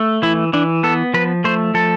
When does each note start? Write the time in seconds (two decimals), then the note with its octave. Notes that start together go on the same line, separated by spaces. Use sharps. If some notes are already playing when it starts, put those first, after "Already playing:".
Already playing: A3
0.22 E3 E4
0.53 E3 D4
0.83 B3 A4
1.14 F3 B4
1.44 A3 C5
1.74 F3 A4